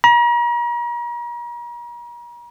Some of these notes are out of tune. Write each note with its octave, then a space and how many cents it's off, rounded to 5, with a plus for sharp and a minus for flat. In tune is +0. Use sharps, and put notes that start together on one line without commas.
A#5 +40